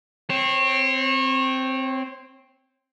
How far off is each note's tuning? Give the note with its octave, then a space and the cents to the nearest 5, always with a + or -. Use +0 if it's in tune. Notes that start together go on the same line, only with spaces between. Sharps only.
C4 +0 C#5 -30